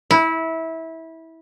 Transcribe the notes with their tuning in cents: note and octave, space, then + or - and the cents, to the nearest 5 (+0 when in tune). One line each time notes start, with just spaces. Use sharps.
E4 -20